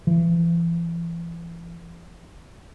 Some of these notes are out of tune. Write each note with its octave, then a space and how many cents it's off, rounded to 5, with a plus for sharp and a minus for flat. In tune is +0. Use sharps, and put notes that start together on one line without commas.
E3 +35